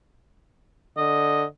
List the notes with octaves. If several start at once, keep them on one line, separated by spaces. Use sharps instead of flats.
D3 D#5